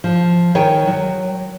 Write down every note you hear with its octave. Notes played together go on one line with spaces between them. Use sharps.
F3
D#3 C#5 G5 G#5
F#3